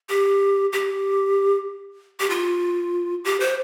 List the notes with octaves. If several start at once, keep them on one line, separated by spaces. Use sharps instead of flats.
G4
G4
G4
F4
G4
C5